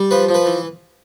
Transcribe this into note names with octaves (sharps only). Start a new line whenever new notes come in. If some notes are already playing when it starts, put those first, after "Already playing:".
Already playing: G3
F3 B4
F3
B4
E3